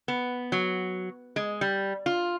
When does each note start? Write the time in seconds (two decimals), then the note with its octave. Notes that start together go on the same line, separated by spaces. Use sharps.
0.08 B3
0.52 F#3
1.36 G#3
1.61 G3
2.06 F4